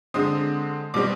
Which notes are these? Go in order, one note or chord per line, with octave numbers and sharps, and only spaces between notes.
D3 G#3 C4 D#6
B2 G3 C4 D6